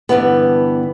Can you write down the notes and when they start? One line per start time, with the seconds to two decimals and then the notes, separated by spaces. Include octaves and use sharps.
0.09 G2 D3 E3 B3